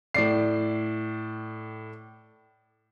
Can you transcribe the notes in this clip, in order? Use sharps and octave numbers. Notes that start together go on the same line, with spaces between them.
A2 D5 C7